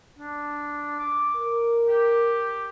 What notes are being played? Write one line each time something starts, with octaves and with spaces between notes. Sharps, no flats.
D4
D6
A#4
G4